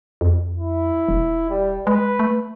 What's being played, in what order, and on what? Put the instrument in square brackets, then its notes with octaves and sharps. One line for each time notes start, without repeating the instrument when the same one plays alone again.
[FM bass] F2
[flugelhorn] E4
[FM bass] E1
[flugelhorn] G3
[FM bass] G#3 [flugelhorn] B4
[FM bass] A3